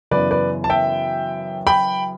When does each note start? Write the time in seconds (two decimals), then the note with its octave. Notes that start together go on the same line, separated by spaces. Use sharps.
0.11 F#2 C#3 E3 B3 B4 D5
0.31 B4 D5
0.64 A5
0.70 E5 G5
1.67 G5 B5